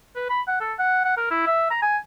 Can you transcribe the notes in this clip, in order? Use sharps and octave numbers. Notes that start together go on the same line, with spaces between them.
B4
B5
F#5
A4
F#5
F#5
A#4
E4
E5
A#5
G#5